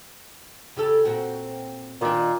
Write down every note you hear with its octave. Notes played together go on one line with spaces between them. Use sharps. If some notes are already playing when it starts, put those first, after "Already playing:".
C#3 G4 A4
A#2 C4 F#4
A#2 D#3 D4